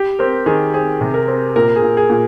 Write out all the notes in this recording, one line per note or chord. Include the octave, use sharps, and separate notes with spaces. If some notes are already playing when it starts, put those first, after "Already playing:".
Already playing: G4
C4 A#4
D#3 G#4
C4 G#4
C3
A#4
C4
A#2 A#4
G#4
A#2
G#4
A#2